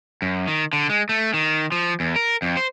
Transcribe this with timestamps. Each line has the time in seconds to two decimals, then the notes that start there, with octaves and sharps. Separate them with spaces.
0.22 F#2
0.47 D#3
0.73 D3
0.89 G#3
1.09 A3
1.34 D#3
1.72 F3
2.00 E2
2.16 A#4
2.42 F2
2.57 C5